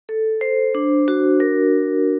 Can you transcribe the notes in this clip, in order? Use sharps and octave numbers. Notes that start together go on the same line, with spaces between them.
A4
C5
D4
F#4
A#4